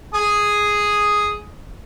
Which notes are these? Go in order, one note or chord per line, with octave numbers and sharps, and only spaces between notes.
G#4 D#6